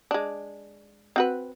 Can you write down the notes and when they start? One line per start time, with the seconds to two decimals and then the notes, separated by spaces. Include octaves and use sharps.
0.11 G#3 D4
1.16 C4 F#4 B4